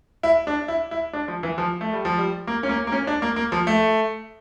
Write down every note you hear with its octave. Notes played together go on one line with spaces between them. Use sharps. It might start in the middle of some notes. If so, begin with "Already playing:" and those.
E4
D4
E4
E4
D4
F3
E3
F3
A3
G3
F3
G3
A#3
C#4
A#3
A#3
C#4
D4
A#3
A#3
F3
A3